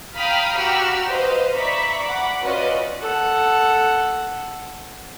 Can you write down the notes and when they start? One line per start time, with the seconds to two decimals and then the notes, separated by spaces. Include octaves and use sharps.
0.16 F5 G5 A#5 B5 D#6 F6
0.56 F#4 G4 A#5 B5 E6 F6
1.09 B4 C5 D#5 F5
1.54 D5 E5 A#5 B5 C#6 B6
2.03 F#5 B5 D6
2.42 C#4 F4 F#4 B4 D5 D#5
3.01 A4 F#5